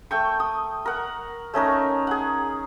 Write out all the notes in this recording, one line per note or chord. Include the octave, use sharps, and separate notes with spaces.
A3 G5 C#6
D#6
A#4 F#5
A3 C#4 D#4 A#4
G#4 F#5